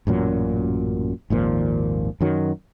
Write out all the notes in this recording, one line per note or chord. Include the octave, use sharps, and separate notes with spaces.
A1 F#2 A#2 F#3
G#1 D#2 A#2 F3
F#2 D#3 F#3